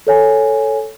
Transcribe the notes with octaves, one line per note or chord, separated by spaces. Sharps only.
A4 C#5 G#5